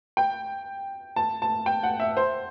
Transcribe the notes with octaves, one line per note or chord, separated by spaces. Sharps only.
G5
A5
A5
G5
F#5
E5
C5